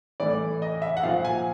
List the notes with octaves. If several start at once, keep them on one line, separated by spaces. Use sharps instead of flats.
A2 E3 D5
D#5
E5
F#5
A#2 F3 F5
G#5